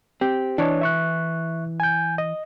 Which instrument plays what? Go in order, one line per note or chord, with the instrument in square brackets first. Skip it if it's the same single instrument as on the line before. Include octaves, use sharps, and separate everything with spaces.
[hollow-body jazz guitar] C4 [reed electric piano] G4
[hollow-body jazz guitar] E3 [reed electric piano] D4 C#5 D#5
[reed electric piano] E5 C#6 F#6
G#5 G6
D#5